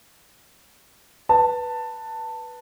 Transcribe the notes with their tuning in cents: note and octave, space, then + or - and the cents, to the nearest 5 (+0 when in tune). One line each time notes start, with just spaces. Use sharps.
B4 -5 A5 +15